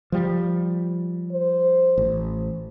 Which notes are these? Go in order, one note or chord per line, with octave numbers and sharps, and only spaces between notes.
F3 G3
C5
A1